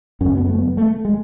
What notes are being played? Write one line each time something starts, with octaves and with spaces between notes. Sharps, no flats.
F#2 C#3 C#4
B3
A3
B3
A3
G#3